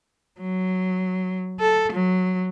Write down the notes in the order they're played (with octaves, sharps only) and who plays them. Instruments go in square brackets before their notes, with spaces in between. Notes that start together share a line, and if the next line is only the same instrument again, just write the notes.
[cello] F#3
A4
F#3